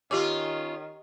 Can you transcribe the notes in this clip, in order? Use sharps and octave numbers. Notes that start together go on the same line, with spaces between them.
D#3 C#4 F4 G4 D6